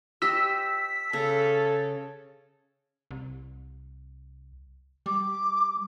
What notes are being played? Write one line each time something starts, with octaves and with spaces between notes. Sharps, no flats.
G4 C5 D#5 E6 B6
C#3 A4
C2
G3 D6